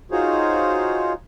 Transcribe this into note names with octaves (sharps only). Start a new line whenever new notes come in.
D#4 F4 F#4 G#4 C5 C#5